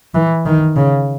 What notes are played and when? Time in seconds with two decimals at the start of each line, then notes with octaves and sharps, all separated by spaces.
0.14 E3
0.46 D#3
0.77 C#3